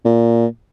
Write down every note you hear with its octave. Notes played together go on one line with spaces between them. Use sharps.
A#2